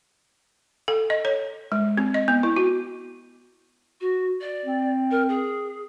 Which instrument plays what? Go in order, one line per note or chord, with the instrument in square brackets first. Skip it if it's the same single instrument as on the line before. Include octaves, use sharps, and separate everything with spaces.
[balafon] A4
D#5
C#5
G#3
C4
D#5
B3
E4
F#4
[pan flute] F#4
D5
[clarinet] C4
[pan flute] A#4
G#4